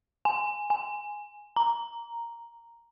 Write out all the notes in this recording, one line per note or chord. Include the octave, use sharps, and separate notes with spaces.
G#5
G#5
A#5